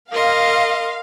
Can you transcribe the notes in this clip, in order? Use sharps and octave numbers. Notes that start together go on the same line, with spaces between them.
A#4 D#5 F5 C6